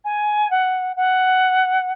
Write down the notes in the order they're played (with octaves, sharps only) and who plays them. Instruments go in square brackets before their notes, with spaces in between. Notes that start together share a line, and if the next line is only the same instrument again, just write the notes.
[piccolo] G#5
F#5
F#5